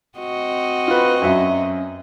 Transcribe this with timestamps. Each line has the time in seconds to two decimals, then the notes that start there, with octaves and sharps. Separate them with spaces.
0.18 C4 F#4 D#5
0.88 F4 B4
1.22 F#2 F#3 E5